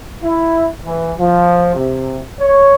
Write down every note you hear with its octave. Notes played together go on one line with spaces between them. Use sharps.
E4
E3
F3
C3
C#5